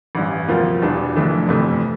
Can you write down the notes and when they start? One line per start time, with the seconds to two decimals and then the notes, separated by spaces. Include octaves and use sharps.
0.15 A1 G2 E3
0.48 D2 C3 F3 A#3 F4
0.82 E1 E2 E3 G3 D4
1.16 F1 F2 E3 A3 D4
1.49 G1 F2 C3 E3 A3